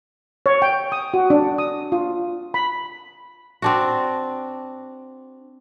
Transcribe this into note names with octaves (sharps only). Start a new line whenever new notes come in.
C#5
G5
D#6
F#4
D4
D#6
F4
B5
C4 D4 F#4